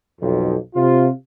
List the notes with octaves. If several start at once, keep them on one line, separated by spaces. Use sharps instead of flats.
B1 F2
C3 F4